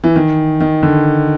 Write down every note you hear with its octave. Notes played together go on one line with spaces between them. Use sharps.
E3
D#3
D#3
D3